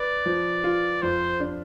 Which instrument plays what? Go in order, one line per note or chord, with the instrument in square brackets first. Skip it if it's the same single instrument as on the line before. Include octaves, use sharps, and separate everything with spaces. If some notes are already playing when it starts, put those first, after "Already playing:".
Already playing: [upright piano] B4 [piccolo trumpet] D5
[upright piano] F3
F4
[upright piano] F2 [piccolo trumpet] C5
[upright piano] D4